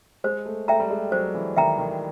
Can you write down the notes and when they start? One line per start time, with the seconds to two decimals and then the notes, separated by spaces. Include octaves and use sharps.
0.24 G#3 C5
0.46 A3
0.68 A3 E5 G5 A#5
0.80 G3
0.90 G#3
1.12 F#3 C5
1.35 E3
1.57 D#3 E5 G5 A#5
1.78 D#3